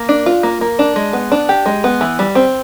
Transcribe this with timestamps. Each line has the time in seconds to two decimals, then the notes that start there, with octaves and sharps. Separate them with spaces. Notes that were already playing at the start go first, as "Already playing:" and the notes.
Already playing: A#3
0.09 D4
0.26 F4
0.43 A#3
0.61 A#3
0.79 D4
0.96 G#3
1.13 B3
1.32 D4
1.49 G4
1.66 G#3
1.84 B3
2.01 E3
2.19 G3
2.35 C4